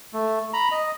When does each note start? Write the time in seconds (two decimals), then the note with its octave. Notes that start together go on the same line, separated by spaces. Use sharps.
0.13 A3
0.53 A#5 B5
0.72 D#5